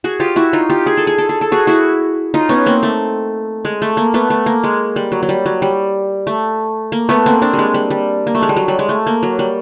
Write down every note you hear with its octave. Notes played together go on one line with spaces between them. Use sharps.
F#4 G#4
F4 G4
E4 F#4
D#4 F4
F4 G4
G#4
A4
G#4
A4
G#4
A4
F#4 G#4
E4 F#4
D#4 F4
B3 C#4
A#3 C4
A3
G#3
A3
A#3
A3 B3
A3
A#3
G#3
G3
F#3
F#3
G3
F#3
G3
A3
A#3
A3 B3
A#3 C4
C4 D4
G3
G#3
G3
G3
A#3
A3
G#3
G3
F#3
G3
G#3
A3
A#3
F#3
G3